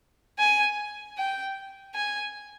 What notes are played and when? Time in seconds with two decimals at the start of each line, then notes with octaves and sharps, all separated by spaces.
0.39 G#5
1.18 G5
1.95 G#5